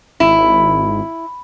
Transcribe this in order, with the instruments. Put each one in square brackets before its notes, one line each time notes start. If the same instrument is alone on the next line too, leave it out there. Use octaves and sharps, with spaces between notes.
[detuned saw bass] G#1 [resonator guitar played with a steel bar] E4